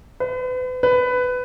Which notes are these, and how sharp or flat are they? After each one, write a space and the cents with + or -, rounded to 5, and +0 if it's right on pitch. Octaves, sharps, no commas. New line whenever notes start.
B4 +40
B4 +15